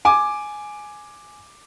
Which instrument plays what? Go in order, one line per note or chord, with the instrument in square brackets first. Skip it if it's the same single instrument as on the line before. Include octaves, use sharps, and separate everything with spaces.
[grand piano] G#5 D6